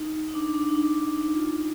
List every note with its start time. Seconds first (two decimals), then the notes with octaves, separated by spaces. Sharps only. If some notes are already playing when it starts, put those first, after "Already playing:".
Already playing: D#4
0.28 D#4
0.34 D4
0.54 D4
0.69 D#4
0.74 D4
1.15 D#4
1.26 D#4
1.35 F4
1.55 D#4